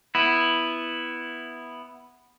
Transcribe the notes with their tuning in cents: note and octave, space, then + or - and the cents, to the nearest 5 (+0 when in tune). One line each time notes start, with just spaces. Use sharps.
B3 +0 E4 +0